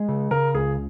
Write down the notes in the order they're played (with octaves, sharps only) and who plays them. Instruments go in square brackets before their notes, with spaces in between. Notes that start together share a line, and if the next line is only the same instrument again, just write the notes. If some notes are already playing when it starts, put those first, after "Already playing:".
Already playing: [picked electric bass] G#3
C#3
[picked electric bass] C#3 [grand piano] A#4
[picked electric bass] C#2 [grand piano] G#4